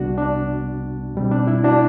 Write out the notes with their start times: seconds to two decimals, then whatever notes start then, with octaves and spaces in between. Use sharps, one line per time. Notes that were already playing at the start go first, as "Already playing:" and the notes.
Already playing: C2 C3 G3 B3 D4 F#4
0.18 D4
1.15 B2 G3 C4
1.31 D4
1.47 E4
1.64 D4 F#4